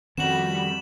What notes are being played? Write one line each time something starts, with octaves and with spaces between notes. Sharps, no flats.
F2 D#3 G3 C#4 F#4 B5 E7 F#7